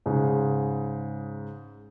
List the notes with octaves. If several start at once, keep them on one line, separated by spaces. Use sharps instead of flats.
G#2 C#3